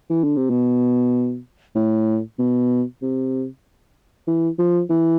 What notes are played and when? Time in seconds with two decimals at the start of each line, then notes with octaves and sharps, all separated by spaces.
0.10 E3
0.24 D3
0.37 C3
0.50 B2
1.75 A2
2.39 B2
3.02 C3
4.27 E3
4.59 F3
4.90 E3